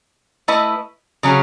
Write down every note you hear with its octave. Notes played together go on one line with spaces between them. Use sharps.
A3 E4 B4 D#5
C#3 F#3 C#4 G#4